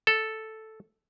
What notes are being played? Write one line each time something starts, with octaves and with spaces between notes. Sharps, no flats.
A4